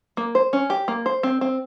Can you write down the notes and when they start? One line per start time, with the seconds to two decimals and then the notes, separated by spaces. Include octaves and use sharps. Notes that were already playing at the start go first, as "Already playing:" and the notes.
0.17 A#3
0.35 C5
0.53 C#4
0.70 G4
0.88 A#3
1.06 C5
1.23 C4
1.41 C4